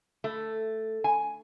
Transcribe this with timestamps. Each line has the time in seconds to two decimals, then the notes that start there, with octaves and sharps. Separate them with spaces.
0.24 A3
1.04 G#5